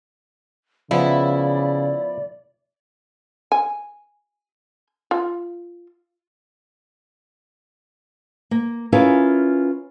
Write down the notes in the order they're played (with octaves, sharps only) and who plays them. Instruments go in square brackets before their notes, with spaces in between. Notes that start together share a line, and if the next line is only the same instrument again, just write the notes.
[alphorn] C#3 [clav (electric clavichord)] F3 B3 [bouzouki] E4 [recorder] D5
[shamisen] G#5
F4
[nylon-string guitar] A#3
C#4 E4 F4 G#4 A#4 B4